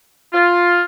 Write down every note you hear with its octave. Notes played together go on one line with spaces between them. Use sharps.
F4